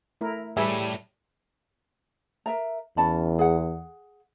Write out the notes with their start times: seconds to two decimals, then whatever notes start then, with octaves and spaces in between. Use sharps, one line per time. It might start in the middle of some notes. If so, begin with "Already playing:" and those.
0.21 A3 E4 A#4
0.57 A2 E3 G3 G#4 B4 E5
2.46 A#4 E5 A#5
2.97 E2 C#4 A5 B5
3.39 G#4 F#5